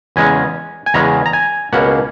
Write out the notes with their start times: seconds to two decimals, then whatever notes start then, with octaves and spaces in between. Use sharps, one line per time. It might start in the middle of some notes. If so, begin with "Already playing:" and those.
0.16 E2 C#3 G#3 C#4 G#5
0.86 G#5
0.94 E2 C#3 G#3 C#4 A#5
1.26 A#5
1.33 G#5
1.73 C#2 B2 A#3 C#4 F#5